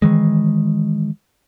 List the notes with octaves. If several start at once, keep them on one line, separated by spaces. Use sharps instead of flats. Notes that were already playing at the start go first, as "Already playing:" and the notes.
D#3 E3 G#3